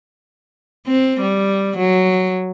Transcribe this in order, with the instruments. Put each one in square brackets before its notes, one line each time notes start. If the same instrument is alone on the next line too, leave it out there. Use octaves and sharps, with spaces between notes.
[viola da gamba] C4
G3
F#3